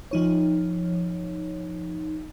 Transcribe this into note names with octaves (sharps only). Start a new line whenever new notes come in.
F3 D#4 C#5